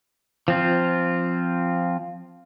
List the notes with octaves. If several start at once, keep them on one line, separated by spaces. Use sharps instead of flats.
F3 C4 F4